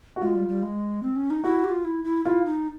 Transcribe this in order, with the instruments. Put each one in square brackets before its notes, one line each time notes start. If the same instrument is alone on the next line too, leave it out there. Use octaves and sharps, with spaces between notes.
[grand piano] F#4
[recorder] G#3 [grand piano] F4
[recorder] G3
G3
G#3
C4
C#4
D#4
[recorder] E4 [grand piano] F#4
[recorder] G4
F4
E4
E4
[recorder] E4 [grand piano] F4
[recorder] D#4